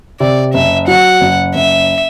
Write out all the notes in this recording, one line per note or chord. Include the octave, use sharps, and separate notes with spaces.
C3 D5
F#1 E5
F#3 F#5
F#1
F#1 E5